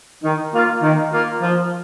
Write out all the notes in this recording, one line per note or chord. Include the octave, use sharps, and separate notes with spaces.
D#3
A#3 F4
D#3
A#3 F4
F3